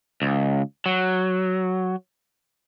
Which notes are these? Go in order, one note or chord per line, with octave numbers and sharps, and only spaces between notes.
C#2
F#3